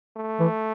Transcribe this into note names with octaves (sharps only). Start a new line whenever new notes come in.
A3
E3